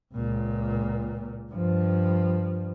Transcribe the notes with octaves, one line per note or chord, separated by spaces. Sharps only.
C#2 A#2
G2 F3